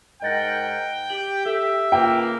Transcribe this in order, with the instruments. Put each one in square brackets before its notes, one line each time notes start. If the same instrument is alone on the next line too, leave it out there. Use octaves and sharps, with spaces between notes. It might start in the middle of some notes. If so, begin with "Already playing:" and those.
[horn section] G#2 A#4 F#5 [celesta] D#5 A6 A#6 [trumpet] G5
[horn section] G4 [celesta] F#7
[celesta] A4 [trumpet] E5
[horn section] C#3 A#3 [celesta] F4 B4 [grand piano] G5